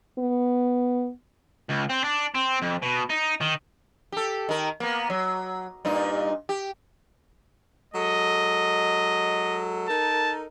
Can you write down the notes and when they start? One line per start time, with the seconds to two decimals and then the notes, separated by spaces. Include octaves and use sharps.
0.18 B3
1.69 C#2
1.89 C4
2.04 D4
2.34 C4
2.62 F2
2.82 B2
3.10 D#4
3.41 D#3
4.12 G4 A4
4.49 D#3 A#4
4.80 A#3 B3
5.10 F#3
5.85 G2 A#2 D#4
6.49 G4
7.94 F#3 G#3 A4 D#5
9.89 D#4 A4 A#4 A5